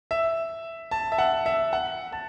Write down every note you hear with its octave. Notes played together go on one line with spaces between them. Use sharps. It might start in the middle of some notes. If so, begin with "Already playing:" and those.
E5
A5
E5
F#5
E5
F#5
A5